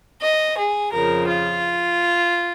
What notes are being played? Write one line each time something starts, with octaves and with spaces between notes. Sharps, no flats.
D#5
G#4
F2 C#3 F3 A#4
F4